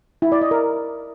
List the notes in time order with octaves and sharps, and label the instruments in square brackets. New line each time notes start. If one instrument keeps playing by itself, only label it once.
[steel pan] E4
D5
D#5
A#4